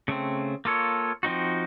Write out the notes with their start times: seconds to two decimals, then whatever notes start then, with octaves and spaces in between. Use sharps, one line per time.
0.08 C#3 A3 C4
0.65 A#3 F4 A4 C#5
1.23 F3 C4 D#4 F#4